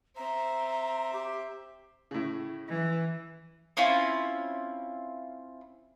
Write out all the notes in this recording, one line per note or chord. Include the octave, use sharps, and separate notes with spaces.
C4 E5 A#5
G4
A2 C#3
E3
C4 C#4 E4 F4